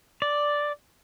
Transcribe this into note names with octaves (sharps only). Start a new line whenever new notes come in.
D5